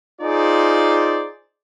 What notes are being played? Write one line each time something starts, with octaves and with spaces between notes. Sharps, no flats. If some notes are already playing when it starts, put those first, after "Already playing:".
D#4 F4 G#4 C5 D5